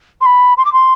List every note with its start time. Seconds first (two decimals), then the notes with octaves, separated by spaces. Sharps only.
0.21 C6
0.26 B5
0.57 C6
0.65 D6
0.73 C6